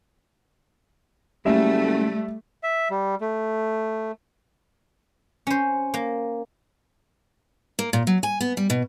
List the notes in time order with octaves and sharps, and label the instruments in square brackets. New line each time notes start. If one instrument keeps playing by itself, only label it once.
[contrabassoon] F#1 [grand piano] G3 E5 [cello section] A3
[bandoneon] E5
G3
A3
[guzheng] C#4 C5
A#3
[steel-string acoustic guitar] A#3
A#2
F#3
G#5
B3
G3
B2